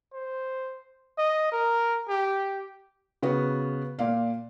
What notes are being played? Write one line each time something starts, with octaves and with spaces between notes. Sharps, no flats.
C5
D#5
A#4
G4
C#3 B3 F#4
A#2 D5 F5